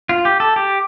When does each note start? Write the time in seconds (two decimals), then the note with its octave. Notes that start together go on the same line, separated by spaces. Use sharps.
0.09 F4
0.25 G4
0.40 A4
0.56 G4